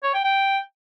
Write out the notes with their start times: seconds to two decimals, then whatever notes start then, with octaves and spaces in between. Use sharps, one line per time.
0.03 C#5
0.14 G5
0.24 G5